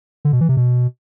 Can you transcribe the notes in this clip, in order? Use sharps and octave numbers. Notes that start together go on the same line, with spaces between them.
D3
B2
E3
C3
B2